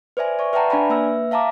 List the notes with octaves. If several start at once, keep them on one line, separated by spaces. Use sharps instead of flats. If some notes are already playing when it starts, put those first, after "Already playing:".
B4 C5 D5 E5 G#5
D5 E5 C#6
B4 E5 F#5 G5 A5 A#5
D4 D5 G#5 B5
A#3 B4 E5 E6
E5 F5 A5 A#5 D6